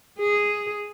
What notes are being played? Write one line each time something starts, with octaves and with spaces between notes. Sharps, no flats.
G#4